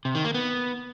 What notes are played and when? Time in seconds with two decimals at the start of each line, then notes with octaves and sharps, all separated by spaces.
0.05 C3
0.15 D#3
0.25 A#3
0.34 B3